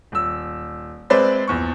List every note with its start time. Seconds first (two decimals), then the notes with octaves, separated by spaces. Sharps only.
0.12 D#1 E6
1.10 G#3 C4 B4 C5 D5 E5
1.47 A#1 E2 C#6